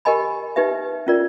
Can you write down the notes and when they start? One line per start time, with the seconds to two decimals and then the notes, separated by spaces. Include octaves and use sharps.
0.05 G4 A#4 D#5 G#5 B5
0.56 D#4 G4 B4 E5
1.07 C#4 F4 A#4 D5